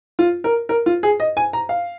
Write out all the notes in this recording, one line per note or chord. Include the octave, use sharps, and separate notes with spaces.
F4
A#4
A#4
F4
G#4
D#5
G#5
A#5
F5